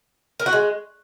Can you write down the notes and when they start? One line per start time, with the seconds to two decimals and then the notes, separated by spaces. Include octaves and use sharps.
0.40 A#4
0.46 F#4
0.53 G#3